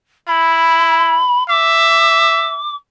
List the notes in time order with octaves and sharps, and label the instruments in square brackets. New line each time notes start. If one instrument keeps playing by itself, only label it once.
[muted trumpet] E4 [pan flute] B5
[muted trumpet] E5 [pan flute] D6